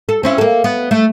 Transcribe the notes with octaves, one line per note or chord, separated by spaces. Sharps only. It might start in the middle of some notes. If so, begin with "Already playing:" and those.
A4
C4 C#4 E4
A#3 A4
B3
A3